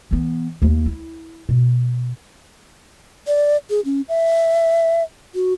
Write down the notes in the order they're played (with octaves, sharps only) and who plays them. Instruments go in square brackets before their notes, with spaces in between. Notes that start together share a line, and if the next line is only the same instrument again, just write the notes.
[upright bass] E3 B3
D#2 A#3
E4
B2
[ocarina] D5
G#4
C#4
E5
F#4